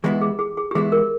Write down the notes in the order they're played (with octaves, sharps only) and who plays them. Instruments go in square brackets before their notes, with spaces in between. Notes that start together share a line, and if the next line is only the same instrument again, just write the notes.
[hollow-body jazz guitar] E3 G#3 B3 E4 [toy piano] G4
[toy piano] G#4
G#4
G#4
G4
[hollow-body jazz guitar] E3 G#3 B3 E4 [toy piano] G#4
[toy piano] A#4